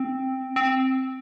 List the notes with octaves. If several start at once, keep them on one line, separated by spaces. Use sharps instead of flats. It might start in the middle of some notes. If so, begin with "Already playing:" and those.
Already playing: C4
C4